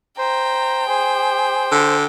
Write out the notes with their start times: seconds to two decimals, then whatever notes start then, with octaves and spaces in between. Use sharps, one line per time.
0.18 C5 G5 A#5
0.89 G#4 C5
1.71 D3